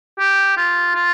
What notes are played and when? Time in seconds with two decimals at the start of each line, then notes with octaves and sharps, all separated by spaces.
0.19 G4
0.57 F4
0.95 F4